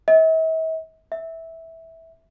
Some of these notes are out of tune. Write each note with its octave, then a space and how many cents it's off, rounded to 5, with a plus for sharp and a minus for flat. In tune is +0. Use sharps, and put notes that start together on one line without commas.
E5 -45
E5 -15